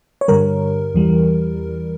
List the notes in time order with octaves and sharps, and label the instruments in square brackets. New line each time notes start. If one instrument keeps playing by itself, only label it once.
[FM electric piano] C#5
G2 D3 G3 A#4
E2 E3 G3